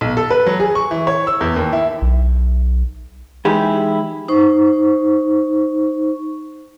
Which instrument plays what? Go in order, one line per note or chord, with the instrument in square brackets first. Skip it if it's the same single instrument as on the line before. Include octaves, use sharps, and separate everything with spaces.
[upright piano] B1
A4
B4
F#3
G#4
C#6
E3
C#5
E6
E2
D#2
E4
[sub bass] B1
[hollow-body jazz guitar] E3 G#3 D#4 E4 G4 G#4
[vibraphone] D#4 C5 C#6